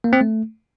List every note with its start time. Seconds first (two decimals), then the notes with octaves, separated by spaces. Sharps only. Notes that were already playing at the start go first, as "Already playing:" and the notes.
0.04 A#3
0.13 C4
0.21 A3